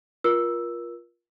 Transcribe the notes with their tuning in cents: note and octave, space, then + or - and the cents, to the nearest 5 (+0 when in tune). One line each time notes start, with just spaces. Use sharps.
F4 +0 A#4 +35 E6 +0